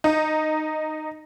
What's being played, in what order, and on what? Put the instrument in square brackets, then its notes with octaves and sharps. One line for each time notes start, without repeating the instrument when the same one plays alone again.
[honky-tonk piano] D#4